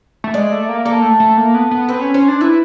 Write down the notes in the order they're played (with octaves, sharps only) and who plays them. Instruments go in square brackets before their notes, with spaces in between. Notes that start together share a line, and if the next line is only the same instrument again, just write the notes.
[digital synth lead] A3
[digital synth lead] G#3 [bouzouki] D5
[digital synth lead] A3
A#3
[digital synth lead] A#3 [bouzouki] A4
[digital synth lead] A3
A3
A#3
B3
B3
[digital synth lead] C4 [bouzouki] B4
[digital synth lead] C#4
[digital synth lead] C#4 [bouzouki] C5
[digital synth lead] D4
[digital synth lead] E4 [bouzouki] B4